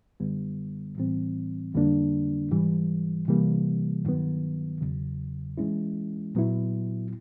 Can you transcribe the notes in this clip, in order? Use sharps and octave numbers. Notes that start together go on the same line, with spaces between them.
F#2 D3 G3 B3
A2 E3 G3 C4
F2 D3 G3 A#3 D4
G#2 E3 G3
C3 E3 G3 A#3
G2 D#3 F#3 B3
E2 C#3 F#3
E3 G#3 C#4 E4
A#2 F#3 B3 E4